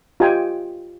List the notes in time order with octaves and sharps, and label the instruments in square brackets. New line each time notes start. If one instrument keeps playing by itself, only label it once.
[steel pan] F4 G4 C5 D#5 G5 G#5